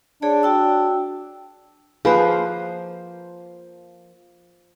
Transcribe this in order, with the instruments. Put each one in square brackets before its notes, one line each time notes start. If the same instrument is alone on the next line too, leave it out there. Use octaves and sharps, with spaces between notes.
[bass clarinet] D4 [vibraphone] G#4 C#5 D5
[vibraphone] F#4 G5 E6
[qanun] F3 A#3 C5 [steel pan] G#4 B4